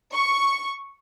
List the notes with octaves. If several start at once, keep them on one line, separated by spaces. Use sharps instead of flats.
C#6